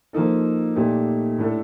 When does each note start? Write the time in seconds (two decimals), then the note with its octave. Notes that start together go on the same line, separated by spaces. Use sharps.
0.13 F3 A#3 D#4 A4
0.76 A#2 A3 D#4 G4
1.38 A2 A3 D4 A4